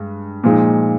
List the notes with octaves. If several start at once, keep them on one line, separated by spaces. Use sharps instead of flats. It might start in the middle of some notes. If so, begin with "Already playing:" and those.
Already playing: G2 G#3
A#2 F3 G#3 D#4